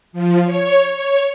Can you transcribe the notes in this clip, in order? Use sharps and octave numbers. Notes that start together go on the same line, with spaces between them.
F3
C#5
C#5